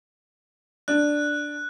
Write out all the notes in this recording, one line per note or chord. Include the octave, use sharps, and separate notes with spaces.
D4 F#6